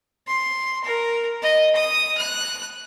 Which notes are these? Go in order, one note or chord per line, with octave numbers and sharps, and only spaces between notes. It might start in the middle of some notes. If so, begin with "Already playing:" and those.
C6
A#4
D#5
D#6
F#6